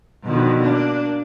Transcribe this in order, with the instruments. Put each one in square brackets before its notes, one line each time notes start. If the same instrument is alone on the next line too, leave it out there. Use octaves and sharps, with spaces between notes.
[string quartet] B2 D3 D#3 F3
A#3 D4